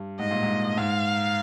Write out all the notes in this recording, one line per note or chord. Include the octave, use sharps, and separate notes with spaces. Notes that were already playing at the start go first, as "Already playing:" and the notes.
Already playing: G2
G#2 D#5
A#2
G#2
G#2 F5